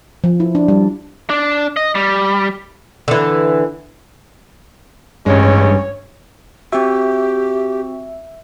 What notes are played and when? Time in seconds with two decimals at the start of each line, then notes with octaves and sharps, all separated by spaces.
0.24 F3
0.40 E4
0.55 D4
0.68 G3
1.30 D4
1.77 D#5
1.95 G3
3.08 D3 E3
5.26 A1 G2 G#3 C#4 C#5
6.72 C4 F#4 G4 E5